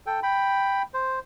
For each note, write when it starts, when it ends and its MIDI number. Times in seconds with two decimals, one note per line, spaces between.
0.06 0.20 69
0.06 0.20 79
0.23 0.82 79
0.23 0.82 83
0.94 1.19 72